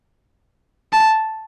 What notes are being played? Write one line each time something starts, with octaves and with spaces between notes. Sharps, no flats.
A5